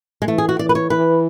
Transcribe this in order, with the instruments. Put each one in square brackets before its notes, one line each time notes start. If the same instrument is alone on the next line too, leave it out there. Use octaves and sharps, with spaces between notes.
[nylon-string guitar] G#3
[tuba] E3 [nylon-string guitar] A3
[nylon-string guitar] G#4
F#4
[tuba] E3 [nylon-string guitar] D5
[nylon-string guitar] B4
C#5
[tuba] E3 [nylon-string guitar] B4